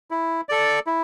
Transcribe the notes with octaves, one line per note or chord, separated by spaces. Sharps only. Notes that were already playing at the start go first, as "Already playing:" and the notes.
E4
A4 D5
E4